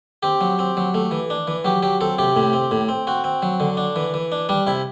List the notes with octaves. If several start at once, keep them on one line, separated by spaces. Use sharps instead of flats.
C4 G4
F#3
C4
F#3
A3
E3
D4
E3
F#3 G4
F#3 G4
C4 A4
C3 G4
A2
C4
A2
C4
C4 F#4
C4
F#3
D3
D4
E3
E3
D4
G3 D4
C3 E4